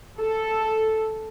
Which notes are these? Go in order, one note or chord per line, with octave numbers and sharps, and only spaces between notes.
A4